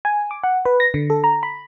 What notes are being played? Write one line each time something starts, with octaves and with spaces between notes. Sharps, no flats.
G#5
D6
F#5
B4
A#6
D3
A4
A#5
B5